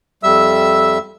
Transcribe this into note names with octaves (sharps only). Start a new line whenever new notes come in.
F2 G3 E5 E6